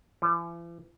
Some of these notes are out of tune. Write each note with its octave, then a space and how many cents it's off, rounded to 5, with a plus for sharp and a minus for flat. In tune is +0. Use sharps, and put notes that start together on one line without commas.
E3 +45